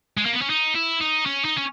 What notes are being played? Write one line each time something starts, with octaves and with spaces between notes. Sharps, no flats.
G#3
A#3
B3
C#4
D#4
E4
D#4
C#4
D#4
C#4